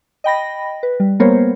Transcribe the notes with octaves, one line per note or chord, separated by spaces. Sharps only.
D#5 G5 B5 A#6
B4
G3
G3 A#3 B3 A#4 C5 C#5